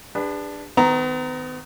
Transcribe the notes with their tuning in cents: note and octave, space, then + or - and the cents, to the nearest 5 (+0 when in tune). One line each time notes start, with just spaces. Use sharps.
D4 +0 G#4 -45 B4 +5
D#3 +0 B3 +45 A#5 +0